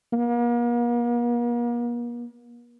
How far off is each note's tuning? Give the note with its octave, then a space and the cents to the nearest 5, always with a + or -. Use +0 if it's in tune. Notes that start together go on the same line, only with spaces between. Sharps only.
A#3 +40